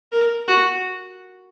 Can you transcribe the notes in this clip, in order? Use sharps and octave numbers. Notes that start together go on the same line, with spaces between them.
A#4
F#4